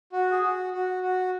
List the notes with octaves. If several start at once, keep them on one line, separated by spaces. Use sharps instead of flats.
F#4
G#4
F#4
F#4
F#4